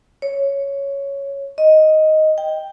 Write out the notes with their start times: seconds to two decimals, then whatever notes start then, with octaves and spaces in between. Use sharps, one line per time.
0.22 C#5
1.58 D#5
2.38 G5